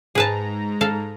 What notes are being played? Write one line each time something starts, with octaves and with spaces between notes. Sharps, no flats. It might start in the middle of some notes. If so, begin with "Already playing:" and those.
G#2 G#4 B4 A5 A#5
A4 F5